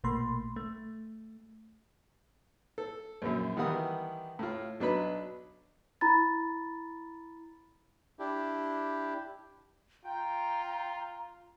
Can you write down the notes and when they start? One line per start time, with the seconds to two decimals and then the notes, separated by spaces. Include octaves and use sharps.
0.04 A#1 B2 A3 A#3 B5 C6
0.56 A3
2.78 A4
3.22 A#1 F#2
3.57 D#3 E3 G3 B3 F#5 D#6
4.39 A2 F4
4.80 B1 F#3 D4 D#4 B4 B5
6.01 E4 A#5 B5 A6
8.19 D4 E4 G4
10.05 F4 G5 A#5